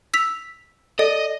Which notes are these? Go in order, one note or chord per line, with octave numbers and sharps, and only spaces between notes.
E6 B6 F7
A4 D5 D#5